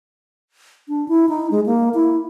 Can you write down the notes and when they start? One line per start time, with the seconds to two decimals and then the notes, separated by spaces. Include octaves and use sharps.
0.88 D4
1.08 E4
1.29 D#4
1.51 G#3
1.66 A#3
1.94 E4